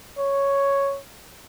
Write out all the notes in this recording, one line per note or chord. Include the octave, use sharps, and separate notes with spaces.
C#5